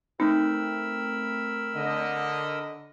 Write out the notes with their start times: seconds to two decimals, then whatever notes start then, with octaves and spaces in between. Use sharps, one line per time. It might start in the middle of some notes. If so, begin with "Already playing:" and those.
0.20 A3 C4 D#4 A#4 B5 E6
1.76 D3 D#5